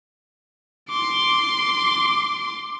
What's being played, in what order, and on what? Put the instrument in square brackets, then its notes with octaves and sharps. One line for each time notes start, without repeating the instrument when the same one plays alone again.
[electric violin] C6 D6